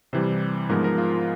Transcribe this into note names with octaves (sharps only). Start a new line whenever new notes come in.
C3 E3 G3 C5
G#2 F3 G#3 B3 A#4
A#4
F4